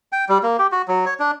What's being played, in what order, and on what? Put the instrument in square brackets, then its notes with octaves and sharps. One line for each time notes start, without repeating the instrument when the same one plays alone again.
[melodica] G5
G3
A#3
G4
F#4
F#3
C#5
D4